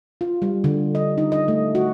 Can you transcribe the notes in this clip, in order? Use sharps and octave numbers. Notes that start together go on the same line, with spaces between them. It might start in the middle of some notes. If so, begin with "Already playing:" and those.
F4
G3
D3
D#5
D#4
D#5
A3
F#4